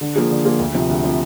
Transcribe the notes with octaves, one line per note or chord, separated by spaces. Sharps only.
D3
F3 A#3 F4 G#4
D3
F3 A#3 F4 G#4
D2
C3 F3
D2
C3 F3